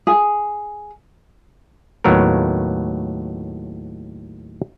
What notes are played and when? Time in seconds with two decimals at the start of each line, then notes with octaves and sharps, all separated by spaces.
0.07 G#4
2.04 D#2 A2 F#3 B3 A#4